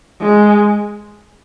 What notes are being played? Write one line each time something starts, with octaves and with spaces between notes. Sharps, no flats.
G#3